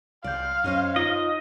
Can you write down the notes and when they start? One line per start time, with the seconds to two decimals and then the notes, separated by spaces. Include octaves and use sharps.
0.24 C2 D5 F5 G6
0.64 F#2 C5 C#5 D#5
0.96 D#4 F4 D#5